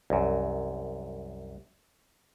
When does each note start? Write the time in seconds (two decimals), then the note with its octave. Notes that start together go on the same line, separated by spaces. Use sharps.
0.10 C2 F#2